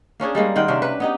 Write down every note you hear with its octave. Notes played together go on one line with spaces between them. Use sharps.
A#3 C#4 D4 G#4
G3 G#3 A#3 C#4
D#3 C5 F#5 G5
C3 A#3 C#4 D4
B4
B3 D#4 G4